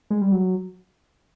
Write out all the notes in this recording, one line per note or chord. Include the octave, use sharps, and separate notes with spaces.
G#3
G3
F#3